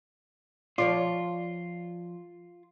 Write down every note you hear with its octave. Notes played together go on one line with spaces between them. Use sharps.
F3 F4 C#5 D5